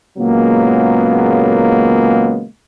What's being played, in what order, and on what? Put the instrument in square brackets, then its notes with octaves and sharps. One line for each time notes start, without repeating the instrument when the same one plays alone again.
[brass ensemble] A#2 C#3 F#3 G#3 A#3 B3